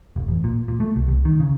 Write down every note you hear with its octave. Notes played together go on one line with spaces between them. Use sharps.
F1
A1
A#2
A#2
A3
C2
C2
D#3
C#3